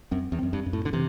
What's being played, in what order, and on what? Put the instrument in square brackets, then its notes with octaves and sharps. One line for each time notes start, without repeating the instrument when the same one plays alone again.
[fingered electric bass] F#2 [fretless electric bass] C4
[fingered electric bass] E2
[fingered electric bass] F#2 [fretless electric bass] C4
[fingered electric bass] G2
[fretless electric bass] F#2
[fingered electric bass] A2
D3
[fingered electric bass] C3 [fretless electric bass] E3